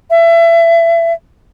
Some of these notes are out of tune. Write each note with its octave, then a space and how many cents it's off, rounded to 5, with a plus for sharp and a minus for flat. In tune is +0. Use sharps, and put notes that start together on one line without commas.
E5 +30